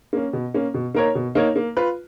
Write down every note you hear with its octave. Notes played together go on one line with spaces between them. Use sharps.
A#3 C#4
B2
A#3 C#4
B2
A#3 D#4 A#4 C#5
B2
A#3 D#4 A#4 C#5
A#3
F4 B4